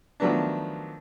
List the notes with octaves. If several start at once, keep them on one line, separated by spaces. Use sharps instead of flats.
D#3 F3 F#3 A3 B3 D4